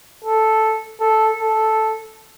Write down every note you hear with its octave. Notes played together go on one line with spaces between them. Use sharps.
A4
A4
A4